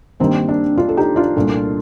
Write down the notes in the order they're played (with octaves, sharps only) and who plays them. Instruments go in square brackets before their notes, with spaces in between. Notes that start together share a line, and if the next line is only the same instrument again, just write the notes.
[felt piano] G2 D#3 G3 A#3 C4
D4
D4 F4
A4
D#4 G4
D4 F4
C2 A#2 A3